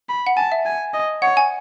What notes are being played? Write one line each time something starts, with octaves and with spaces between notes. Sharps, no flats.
B5
F#5
G#5 A5
E5
G#5
D#5
C#5 F#5
G#5